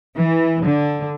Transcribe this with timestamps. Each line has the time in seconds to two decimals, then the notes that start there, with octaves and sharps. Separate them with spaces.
0.16 E3
0.64 D3